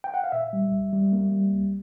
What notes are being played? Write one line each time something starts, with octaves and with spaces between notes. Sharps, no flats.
G5
F#5
F5
A#2 E5
G3
C2
G3
A#3
G3
C2